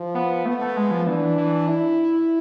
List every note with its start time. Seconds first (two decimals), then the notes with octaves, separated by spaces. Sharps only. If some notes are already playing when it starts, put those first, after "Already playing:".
Already playing: F3
0.15 B3
0.45 A3 B3
0.61 A3
0.77 G#3
0.91 F3
1.07 E3 D4
1.38 E3
1.69 E4